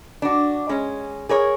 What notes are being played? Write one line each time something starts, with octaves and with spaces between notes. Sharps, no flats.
D4 F#4
G#3 C#4
G#4 A#4 C#5